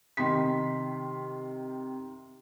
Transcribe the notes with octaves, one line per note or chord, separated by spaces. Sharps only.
C3 D#3 C6 B6